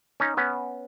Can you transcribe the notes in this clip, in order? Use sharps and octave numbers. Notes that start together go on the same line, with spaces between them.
C#4 D#4
B3 C#4